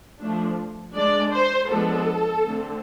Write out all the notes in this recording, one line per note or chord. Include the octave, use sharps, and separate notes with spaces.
F3 A3 D4
G#3 D4 D5
C5
F3 G#3 B3 D4 A4
D3 A3 C4